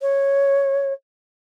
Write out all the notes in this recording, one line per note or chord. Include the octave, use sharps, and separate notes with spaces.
C#5